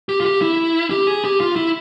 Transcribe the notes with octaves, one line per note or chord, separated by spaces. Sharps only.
G4
F4
G4
E4
G4
G#4
G4
F4
E4